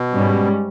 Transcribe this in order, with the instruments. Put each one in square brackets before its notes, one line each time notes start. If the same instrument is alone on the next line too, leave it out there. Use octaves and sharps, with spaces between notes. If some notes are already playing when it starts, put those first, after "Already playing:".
Already playing: [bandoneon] B2
[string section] G#2 G3 C#4